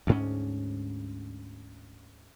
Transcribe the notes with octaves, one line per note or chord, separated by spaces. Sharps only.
D2 G#2 C#4